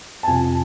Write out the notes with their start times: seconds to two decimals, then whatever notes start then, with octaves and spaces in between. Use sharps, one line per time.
0.23 A5
0.27 F2 C3 F3 G#5